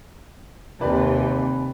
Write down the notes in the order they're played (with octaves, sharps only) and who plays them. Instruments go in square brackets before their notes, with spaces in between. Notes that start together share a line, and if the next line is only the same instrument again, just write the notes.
[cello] D#2 C3 [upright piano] G4 B4 D5